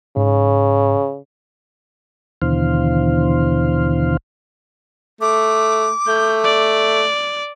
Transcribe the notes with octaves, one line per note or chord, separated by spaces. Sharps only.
G#2 C#3
D#2 B2 D3 E3 C5 F5
A3 D6
A3 G6
D5